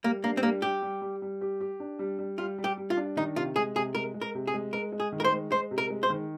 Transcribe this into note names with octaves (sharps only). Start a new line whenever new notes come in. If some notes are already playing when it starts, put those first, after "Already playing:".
G3 A#3
A#3 D4
C4
G3 A#3
G3 G4
G3
G3
G3
G4
G4
D4
G3
G3
G3 F4
G3
G4
G3
F4
D4
D#3 D#4
C3 F4
G#3 G#4
C3 G#4
G#3 A#4
G#3
A#4
C3
G#4
G#3
G#3 A#4
G#3
G#4
D#3
A#4
C5
G#3
G#3 C5
C3
A#4
G#3
C5
D#3